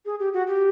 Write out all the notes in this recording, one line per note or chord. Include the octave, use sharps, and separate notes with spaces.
G#4
G4
F#4
G4